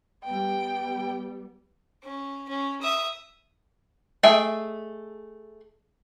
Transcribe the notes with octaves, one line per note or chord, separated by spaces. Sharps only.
G3 B3 G5
C#4
C#4
E5 D#6
A3 G#4 D#5 E5 G5